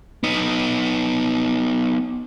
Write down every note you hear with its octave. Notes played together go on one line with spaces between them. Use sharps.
B3 D#4